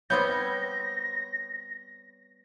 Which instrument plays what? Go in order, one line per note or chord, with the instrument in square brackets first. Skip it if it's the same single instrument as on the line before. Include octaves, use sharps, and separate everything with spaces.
[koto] G3 B3 C4 [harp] C#5 G6 [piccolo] A#6